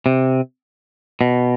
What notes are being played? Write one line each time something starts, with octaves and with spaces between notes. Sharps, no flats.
C3
B2